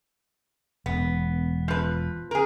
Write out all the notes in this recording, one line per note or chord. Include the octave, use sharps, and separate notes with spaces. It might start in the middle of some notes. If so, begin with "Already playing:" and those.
E1 B3
F3 B4
G#4 A#4